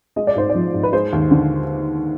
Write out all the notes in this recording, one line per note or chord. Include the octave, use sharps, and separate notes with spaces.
G#3 D#5
D5
G#2 C5
D5
F3
G#2
B4
G#3 C5
D#2
D3